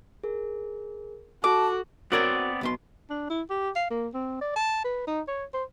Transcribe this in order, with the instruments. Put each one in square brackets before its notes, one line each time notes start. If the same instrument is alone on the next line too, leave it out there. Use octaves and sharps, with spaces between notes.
[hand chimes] G#4 A#4
[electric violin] F#4 [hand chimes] A4 [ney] A5 [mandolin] D6
[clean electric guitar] B3 C4 D5 [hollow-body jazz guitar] F#4 A#4 C#5
[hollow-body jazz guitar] B1 B2 C6
[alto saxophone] D4
E4
G4
F5
A#3
C4
D5
A5
B4
D#4
C#5
C5